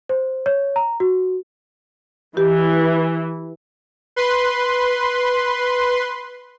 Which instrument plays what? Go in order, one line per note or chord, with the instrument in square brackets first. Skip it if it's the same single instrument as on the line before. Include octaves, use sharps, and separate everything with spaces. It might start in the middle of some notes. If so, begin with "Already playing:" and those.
[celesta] C5
C#5
A#5
F#4
[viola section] E3 [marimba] G4
[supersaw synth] B4 C6